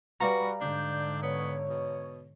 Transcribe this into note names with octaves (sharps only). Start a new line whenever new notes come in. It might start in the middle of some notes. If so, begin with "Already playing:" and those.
G3 F#4 B4 D5 F5 A#5
G#2 D3 D4 G6
B3 C#5
B2